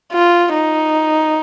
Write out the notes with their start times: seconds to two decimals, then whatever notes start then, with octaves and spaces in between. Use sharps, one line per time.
0.12 F4
0.53 D#4